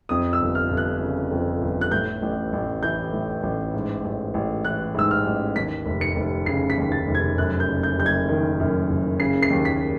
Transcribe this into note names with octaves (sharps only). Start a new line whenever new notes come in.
F2 D#6
E6
G1
F6
G1
F#6
C#3
F2
G1
F#6
A2 G6
A1
A1
E3 G6
A2
A1
G#2
A1
A1
E3 F#6
G#2 E6
F6
A1
D#2 B6
F1
C#7
F1
C#3 C7
B6
D#2
A6
F1
G#6
F#2 F#6
G6
F#1
G6
F#1 G6
G#6
D#3
F#2
F#1
C#3 C7
C7
D#2
B6